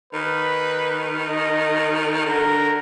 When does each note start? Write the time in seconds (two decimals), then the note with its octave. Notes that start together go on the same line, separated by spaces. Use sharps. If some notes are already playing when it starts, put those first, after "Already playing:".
0.13 D#3 B4
1.28 D#5
2.25 D3 A#4